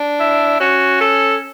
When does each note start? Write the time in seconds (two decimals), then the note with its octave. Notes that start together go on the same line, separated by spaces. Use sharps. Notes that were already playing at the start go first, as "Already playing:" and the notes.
Already playing: D4
0.20 E4
0.60 C#4 F#4
1.00 A4